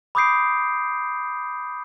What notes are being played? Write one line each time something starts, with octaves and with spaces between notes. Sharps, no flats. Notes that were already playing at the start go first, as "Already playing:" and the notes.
B5 D6 D#6 G6 C7 D7